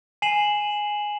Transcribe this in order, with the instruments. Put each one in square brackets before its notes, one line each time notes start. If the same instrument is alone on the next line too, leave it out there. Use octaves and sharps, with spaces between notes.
[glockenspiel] G#5 C7 E7 F#7